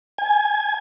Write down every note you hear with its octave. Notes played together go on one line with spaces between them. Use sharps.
G#5